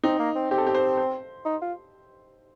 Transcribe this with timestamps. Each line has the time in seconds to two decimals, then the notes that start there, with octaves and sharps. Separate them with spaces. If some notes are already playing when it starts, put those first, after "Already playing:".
0.03 C4 D#4
0.19 A#3
0.35 C4
0.51 C4 G4
0.58 A4
0.66 G4
0.75 C5
0.97 C5
1.45 D#4
1.62 F4